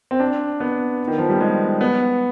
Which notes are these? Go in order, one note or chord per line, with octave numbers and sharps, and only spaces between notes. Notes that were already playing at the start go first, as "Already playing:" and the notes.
C4
D4
B3
D#3
F3
G3
G#3
B3